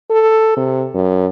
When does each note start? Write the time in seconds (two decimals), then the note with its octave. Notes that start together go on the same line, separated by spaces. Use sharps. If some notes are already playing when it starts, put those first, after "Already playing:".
0.10 A4
0.57 C3
0.94 F#2